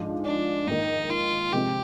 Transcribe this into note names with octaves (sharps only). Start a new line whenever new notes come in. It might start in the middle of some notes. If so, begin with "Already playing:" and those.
Already playing: G#2 F3 G#3 D4
D4
G#2 D#3 A#3 D#4
F4
C3 F3 G#3 C4 G4